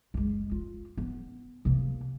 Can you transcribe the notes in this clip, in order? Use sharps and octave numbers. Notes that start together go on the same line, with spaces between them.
F#1 G#3
F4
B3
C3 A#3